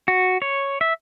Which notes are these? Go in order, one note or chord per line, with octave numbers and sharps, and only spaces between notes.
F#4
C#5
E5